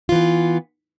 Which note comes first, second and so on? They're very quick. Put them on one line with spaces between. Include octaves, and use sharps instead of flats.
F4 E3 B3